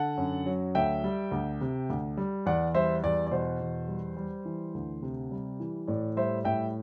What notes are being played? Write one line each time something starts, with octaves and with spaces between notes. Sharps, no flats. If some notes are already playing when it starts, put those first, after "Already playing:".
Already playing: D3 F#5 A5
F#2
F#3
D2 E5 G5
G3
D2
C3
D2
G3
E2 D5 F#5
G3 C5 E5
E2 D5
D5
B2 C5
E2
G3
G3
E3
D2
C3
G3
E3
A2 D5
G3 C5 E5
A2 E5 G5